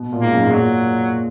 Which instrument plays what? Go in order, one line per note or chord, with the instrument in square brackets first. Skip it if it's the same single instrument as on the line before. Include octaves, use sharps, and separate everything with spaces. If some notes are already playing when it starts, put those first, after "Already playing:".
Already playing: [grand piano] B2
A#2
[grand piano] G#2 [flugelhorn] A#3
[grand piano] F#2
G#2
[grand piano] A#2 [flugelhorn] F#3